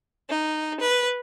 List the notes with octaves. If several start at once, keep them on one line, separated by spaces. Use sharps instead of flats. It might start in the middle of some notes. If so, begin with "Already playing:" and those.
D#4
B4